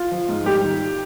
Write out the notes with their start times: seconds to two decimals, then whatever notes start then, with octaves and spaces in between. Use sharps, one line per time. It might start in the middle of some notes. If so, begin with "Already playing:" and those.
Already playing: F4
0.12 F3
0.28 G#2
0.46 G3 G4
0.63 D#3